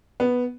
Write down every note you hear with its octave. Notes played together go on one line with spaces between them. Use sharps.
B3